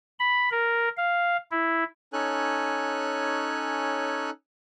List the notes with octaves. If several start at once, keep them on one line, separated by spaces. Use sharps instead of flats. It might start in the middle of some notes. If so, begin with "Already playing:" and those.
B5
A#4
F5
E4
C#4 D#4 A4 C#5 G#5 F#6